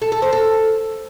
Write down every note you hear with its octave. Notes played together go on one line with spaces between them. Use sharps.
A4
A4
C5
A4